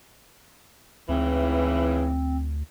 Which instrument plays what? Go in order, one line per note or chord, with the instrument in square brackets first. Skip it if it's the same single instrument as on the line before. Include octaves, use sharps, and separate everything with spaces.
[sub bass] D2 [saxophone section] G#2 C#3 E3 [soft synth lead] C4